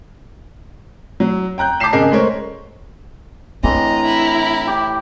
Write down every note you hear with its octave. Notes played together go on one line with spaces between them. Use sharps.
F#3
G5 A#5 F#6 G6
A5 D6 G6 B6 C7 E7
G#1 C#3 G#4 A#4 D#5 C7
G#3 A3 A#4 C5 C#5
A2 E3 C4 D4 D#5 A#5 C6
E4
G4